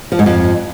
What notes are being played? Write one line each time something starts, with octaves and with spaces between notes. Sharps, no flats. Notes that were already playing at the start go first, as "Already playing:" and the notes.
F3
G#2
F2